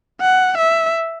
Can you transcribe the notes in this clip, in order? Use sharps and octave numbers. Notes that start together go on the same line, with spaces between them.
F#5
E5